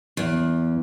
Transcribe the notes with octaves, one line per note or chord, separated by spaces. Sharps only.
E2